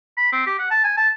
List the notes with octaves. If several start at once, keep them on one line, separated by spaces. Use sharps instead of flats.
B5
C4
G4
F#5
A5
G#5
A5